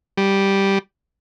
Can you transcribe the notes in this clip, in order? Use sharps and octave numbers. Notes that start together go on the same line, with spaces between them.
G3